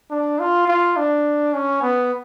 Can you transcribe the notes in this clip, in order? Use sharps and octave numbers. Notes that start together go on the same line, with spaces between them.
D4
F4
F4
D4
C#4
B3